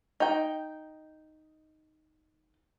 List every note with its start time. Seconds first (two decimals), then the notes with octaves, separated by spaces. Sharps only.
0.20 D#4 G5